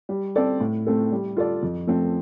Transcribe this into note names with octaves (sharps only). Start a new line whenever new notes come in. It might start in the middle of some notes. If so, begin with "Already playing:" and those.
G3
C4 A4 D5
A2
A3 C4 A4
G3
F4 A4 D5
F2
F3 A3 C4